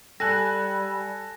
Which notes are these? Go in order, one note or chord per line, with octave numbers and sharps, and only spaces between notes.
G3 A4 G#5 F#6 A#6